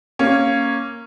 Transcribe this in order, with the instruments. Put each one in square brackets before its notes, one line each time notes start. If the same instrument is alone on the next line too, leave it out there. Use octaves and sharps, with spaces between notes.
[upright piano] A#3 C#4